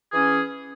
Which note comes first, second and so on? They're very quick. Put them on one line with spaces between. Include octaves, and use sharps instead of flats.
G#4 E3 C#4